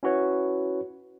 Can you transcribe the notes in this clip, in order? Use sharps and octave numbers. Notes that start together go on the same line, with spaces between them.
C#4 E4 F#4 B4 C#5